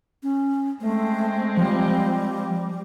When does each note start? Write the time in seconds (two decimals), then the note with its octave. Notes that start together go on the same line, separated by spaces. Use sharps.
0.23 C#4
0.81 G#3 A3 C4
1.57 F3 G3